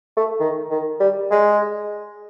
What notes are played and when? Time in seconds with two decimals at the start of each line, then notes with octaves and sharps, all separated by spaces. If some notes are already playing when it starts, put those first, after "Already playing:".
0.17 A3
0.40 D#3
0.70 D#3
1.00 G3
1.31 G#3